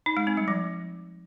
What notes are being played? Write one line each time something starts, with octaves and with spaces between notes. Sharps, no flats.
D#4
G#3
C4
G3
F3